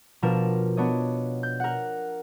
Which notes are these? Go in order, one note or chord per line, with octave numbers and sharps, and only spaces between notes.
B2 F3 D4 A#4 E7
B3 D4 C#5 D#5
G6
A#4 F#5